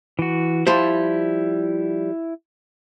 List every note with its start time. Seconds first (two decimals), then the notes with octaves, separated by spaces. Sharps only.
0.19 E3 F#4
0.67 F3 G3 E4 C5